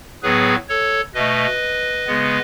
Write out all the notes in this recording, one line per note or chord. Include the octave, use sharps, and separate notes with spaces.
A2 F#3 B3 G#4 B4
A4 C#5
B2 A3 B4 D#5
C#3 G#3 B3